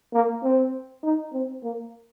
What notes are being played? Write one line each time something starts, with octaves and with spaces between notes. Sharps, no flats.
A#3
C4
D#4
C4
A#3